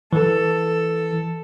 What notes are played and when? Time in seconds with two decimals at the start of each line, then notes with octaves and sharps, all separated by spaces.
0.13 E3 A4